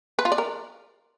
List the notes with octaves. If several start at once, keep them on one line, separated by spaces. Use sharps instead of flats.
B4
F4
D5
A#4